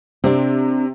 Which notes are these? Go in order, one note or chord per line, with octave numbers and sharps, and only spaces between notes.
C3 C4 D4